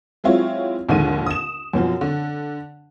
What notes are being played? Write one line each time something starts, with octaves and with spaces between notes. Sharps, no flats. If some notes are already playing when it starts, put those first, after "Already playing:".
F#3 G#3 C4 E4 F4 C#5
A#1 D#2 G#2 D3 G#3 D#7
D#6 E7
F#2 B2 F3 F#3
D3